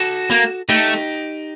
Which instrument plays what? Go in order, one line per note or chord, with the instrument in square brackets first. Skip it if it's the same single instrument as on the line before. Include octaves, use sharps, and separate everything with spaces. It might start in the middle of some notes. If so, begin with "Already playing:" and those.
Already playing: [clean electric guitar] F#4 A4
[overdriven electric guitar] A#3
[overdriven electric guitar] A3 [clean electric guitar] D#4 G4